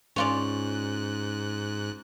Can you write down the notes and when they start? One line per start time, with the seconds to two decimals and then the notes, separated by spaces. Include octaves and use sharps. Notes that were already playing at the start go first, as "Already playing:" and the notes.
0.16 G#2 C#4 F4 D5 F#6